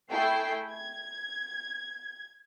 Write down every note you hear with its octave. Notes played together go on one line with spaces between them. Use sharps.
A3 E4 G#4 G5 C7
G#6